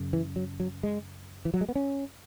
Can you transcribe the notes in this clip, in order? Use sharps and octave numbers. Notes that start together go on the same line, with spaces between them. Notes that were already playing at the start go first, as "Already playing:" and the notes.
Already playing: F#2 C#3
E3
F#3
F#3
G#3
E3
F#3
G#3
B3
C#4